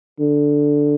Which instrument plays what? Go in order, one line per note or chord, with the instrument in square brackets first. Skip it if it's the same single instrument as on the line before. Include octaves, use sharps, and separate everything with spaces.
[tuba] D3